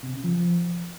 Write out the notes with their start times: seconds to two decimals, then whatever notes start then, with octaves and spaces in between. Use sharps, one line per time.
0.03 C3
0.13 C#3
0.24 F3